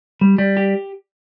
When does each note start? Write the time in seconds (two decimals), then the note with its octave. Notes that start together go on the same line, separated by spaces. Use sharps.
0.21 G3
0.38 G3
0.57 G4